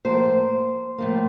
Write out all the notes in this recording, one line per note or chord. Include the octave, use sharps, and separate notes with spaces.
A2 F3 A#3 C5
A2 F3 A#3